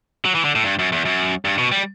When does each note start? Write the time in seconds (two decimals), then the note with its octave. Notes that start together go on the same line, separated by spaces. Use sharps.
0.25 F#3
0.35 E3
0.45 D3
0.55 A2
0.65 G2
0.79 F#2
0.92 E2
1.05 F#2
1.45 G2
1.58 B2
1.72 G3